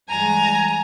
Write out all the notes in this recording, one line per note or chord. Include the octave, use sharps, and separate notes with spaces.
G2 E3 G#3 G#5 A#5